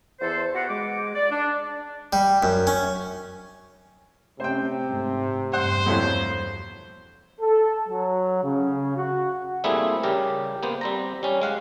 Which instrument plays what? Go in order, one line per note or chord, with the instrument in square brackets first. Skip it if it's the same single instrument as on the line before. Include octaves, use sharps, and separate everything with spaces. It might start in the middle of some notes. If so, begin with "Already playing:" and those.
[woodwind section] E2 E3 A4 C5
B3 F#4 G4 F#5
G#3 D6
D5
D4
[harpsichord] G3
F#2
C#4
[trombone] C3 [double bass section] A3 C#4 [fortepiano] C5 G5
[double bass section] G#2 A3 C4
[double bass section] E2 G2 B2 [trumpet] C5 [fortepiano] F#5
[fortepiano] F2 A2 F#3
[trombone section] A4
F#3
C#3
F#4
[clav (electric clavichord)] G3 A3 A#3 C4 E4 G#4
C#3 G3 G4 A#4
A#3 B3 C5
G3 C4 A#5
G3 C#4
G#3 F5 F#5